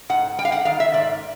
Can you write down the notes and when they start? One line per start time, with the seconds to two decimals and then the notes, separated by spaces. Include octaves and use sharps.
0.09 G#2 F#5
0.38 G3 G5
0.45 F5
0.52 F#5
0.65 D#3 F5
0.80 E5
0.93 G#2 D5